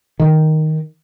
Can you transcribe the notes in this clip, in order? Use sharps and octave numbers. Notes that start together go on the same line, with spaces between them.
D#3